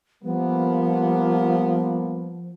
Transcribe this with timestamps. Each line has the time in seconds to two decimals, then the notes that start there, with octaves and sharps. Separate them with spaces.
0.23 F3 G3 A#3 B3